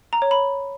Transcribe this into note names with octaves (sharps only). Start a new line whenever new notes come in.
A#5
C#5
B5